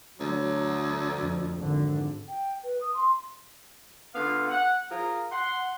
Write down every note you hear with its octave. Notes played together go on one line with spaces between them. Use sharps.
D2 F#3
F2
G#1 D3
G5
B4
D#6
C6
D3 B3 F4 F5
F#5
F4 G#4 A#4
F#5 C6